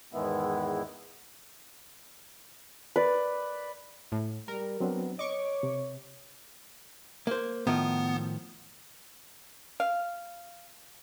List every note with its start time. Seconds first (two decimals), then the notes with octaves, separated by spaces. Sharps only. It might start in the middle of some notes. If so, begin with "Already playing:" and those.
0.13 E2 G#2 D#3 G#3 B3 E4
2.96 B4 D5
4.12 A2
4.48 G3 A#4
4.80 F#3 B3 C4 D4
5.19 C#5 D#5 C#6 D6
5.63 C3
7.27 A#3 C5
7.67 A2 D#3 F3 B3
9.80 F5